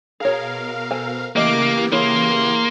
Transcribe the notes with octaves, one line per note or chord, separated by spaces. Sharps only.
B2 G#4 A#4 C#5 F5
A4 C5 G#5
C#3 E3 A3 A#3 G4 A#4 D#5 D6
A#3 E4 G#4 C#5 C6